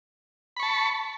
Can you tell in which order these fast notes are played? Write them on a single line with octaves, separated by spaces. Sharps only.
B5 C#6 A5